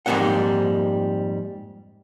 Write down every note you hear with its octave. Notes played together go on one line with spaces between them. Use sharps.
F2 G#2 G3 A#3 C4 F#5